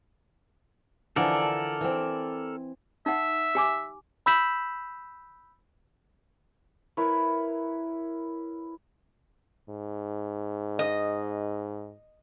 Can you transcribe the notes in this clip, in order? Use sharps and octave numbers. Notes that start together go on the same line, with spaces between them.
D3 E3 F3 A4 A#4 D5
E3 C4
D#4 E5 F#5
G4 G#5 D6
B5 E6 G6 B6 E7 F#7
E4 A#4 B4 C#5
G#2
D#5